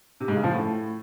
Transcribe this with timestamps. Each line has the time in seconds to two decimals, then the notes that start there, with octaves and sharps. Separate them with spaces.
0.20 C3
0.28 G#2
0.36 C#3
0.44 F3
0.51 A2